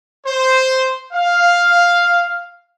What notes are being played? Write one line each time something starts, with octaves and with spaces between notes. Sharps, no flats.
C5
F5